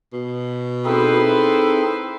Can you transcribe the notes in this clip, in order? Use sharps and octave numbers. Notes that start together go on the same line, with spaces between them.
B2
C4 D#4 E4 G#4 A4 B4 C5